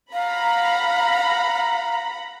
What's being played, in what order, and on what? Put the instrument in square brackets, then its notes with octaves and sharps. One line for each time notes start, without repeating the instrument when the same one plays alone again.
[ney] F5 [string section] F#5 A#5 B5